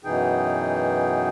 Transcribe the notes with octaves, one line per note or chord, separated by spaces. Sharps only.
F#2 B2 E3 D#4 G#4 G5